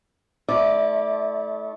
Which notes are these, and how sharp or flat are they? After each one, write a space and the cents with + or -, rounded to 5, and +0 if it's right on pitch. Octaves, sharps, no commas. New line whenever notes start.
A3 -20 E4 -35 D5 +0